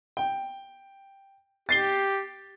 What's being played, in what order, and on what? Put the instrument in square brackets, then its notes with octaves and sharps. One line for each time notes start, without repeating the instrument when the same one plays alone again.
[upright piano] G5
[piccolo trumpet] G4 [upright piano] A6 C7 G7